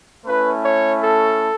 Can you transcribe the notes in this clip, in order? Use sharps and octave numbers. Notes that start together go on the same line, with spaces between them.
A3 C#4 E4 B4
C#5
A4